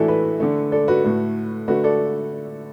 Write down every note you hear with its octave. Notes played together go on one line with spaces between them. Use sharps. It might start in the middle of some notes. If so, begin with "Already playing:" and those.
Already playing: A2 E3 A3 D4 E4 F#4 A4
B4 E5
D3 A3
A4 D5
F#4 B4
A2 A3
D3 A3 F#4 B4
A4 D5